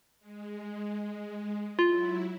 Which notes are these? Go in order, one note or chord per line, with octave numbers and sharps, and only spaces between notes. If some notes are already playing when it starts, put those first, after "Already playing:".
G#3
F#3 E4 F4